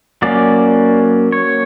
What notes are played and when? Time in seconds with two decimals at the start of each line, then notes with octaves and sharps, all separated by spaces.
0.22 F#3 A#3 C#4 D5
1.32 C#5